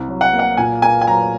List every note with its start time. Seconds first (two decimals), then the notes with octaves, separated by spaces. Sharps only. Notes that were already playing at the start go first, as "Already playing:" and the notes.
Already playing: C2 C3
0.08 F#3
0.21 F#5
0.33 A#3
0.39 F#5
0.57 A#2 G#5
0.82 A#3 G#5
1.01 G#5
1.07 F#3 A#5